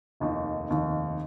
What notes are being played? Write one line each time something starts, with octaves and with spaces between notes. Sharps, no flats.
F1 D#2 D#3
F1 D#2 D#3